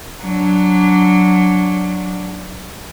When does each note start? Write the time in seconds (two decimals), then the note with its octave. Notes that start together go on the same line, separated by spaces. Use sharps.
0.21 F#3 D4